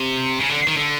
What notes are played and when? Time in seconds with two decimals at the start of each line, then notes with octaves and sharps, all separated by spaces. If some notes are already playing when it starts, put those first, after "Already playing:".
Already playing: C3
0.40 C#3
0.49 D3
0.67 D#3
0.77 D3